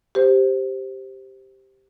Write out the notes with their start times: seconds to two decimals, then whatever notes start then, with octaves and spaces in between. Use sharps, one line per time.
0.15 G4 C5